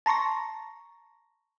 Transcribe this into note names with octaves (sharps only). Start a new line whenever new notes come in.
A5 A#5 C6 C#6 A#6